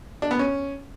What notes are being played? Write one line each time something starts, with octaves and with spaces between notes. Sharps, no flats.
D4
B3
C#4